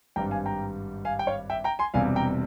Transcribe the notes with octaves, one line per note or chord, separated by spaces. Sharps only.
G#1 G2 G3 G5 A#5
F5 G#5
G5 A#5
F5 G#5
G5
C#5 F5
E5 G5
G5 A#5
G#5 C6
E1 E2 C3 G3 F5 G#5
G5 A#5